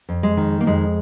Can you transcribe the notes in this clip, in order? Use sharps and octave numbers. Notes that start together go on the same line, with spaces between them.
F2
G#3
D#3
A#3
F2 G#3